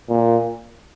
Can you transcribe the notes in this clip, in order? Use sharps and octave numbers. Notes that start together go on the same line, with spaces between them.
A#2